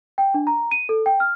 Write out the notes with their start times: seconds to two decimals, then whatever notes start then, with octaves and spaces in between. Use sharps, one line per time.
0.18 G5
0.34 D4
0.47 A#5
0.71 D#7
0.89 A4
1.06 G5
1.20 F6